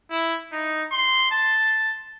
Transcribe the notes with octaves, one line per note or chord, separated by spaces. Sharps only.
E4
D#4
C6
A5